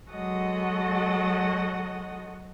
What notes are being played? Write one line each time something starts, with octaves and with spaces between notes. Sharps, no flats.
F#3 G#3 F#4 A4 D#5 F#5